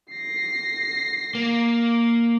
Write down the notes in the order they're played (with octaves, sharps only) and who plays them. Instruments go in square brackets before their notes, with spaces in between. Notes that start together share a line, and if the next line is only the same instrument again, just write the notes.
[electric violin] A#6 C7
[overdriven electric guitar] A#3